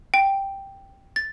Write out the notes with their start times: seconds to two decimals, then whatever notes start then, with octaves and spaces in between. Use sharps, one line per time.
0.14 G5
1.16 A6